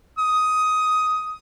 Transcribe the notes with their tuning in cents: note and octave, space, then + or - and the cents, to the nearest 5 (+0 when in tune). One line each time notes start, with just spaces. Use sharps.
D#6 +10